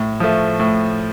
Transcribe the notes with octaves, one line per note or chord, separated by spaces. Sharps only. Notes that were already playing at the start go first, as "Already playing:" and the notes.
Already playing: A2
F3 A3
A2